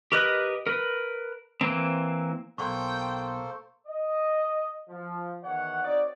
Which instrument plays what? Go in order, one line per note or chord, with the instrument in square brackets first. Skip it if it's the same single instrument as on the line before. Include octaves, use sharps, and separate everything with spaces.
[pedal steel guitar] G4 A#4 B4 D#5 F#6
A#4 B4
E3 A#3 C4
[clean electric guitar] B1 [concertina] A#3 A4 C5 [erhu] G5 [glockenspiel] C6 C#6
[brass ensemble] D#5
F3
E2 D#3 C#5 F#5
C4 D#4 F#4 C#5 D5